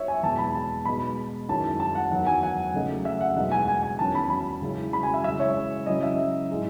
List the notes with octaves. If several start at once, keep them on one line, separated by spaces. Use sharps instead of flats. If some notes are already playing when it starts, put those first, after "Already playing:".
Already playing: D#4 C#5 E5
G#5
E2 B2 G#3 A5
B5
A5
B2 G#3 D#4 B5
F#2 D#3 G#3 C#4 E4 A5
A5
F#5
E2 D#3 F#3 F#5
G#5
F#5
C#3 F#3 A3 D#4
E5
F#5
E2 B2 G#3 D#4 F#5
G#5
G#5
G#5
E2 D#3 F#3 C#4 A5
B5
B5
C#3 G#3 C#4 E4
B5
G#5
E5
C#3 E3 G#3 E5
C#5
C#3 F#3 C#4 E4 D#5
E5
A2 G#3 D#4